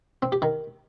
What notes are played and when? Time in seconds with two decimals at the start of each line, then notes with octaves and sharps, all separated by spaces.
0.23 C4
0.32 G4
0.42 D#3